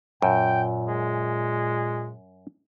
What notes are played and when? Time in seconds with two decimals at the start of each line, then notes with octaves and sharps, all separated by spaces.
0.22 F#2 A#2 G5
0.89 G#3